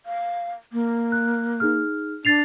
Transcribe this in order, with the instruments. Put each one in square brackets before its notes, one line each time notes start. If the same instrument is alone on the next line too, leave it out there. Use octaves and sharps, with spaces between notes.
[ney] F5
A#3
[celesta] F#6
D#4 G#4 F6
[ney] D4 [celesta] A6 C7 F7